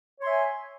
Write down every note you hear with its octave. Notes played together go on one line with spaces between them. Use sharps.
C#5 E5 G#5 C6